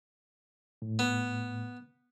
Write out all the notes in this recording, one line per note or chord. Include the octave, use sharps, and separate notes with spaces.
A2
B3